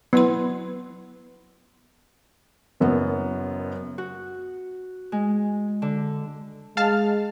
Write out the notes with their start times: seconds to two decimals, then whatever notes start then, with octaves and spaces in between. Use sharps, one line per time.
0.13 F#3 B3 E4 C6
2.80 F#1 F#2 B3
3.98 F#4
5.12 G#3
5.82 D3
6.77 G#3 F5 A5 F6